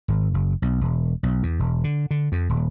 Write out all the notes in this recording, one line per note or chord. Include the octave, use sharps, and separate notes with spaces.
G#1
F#1
B1
E1
B1
E2
E1
D3
D3
F2
D#1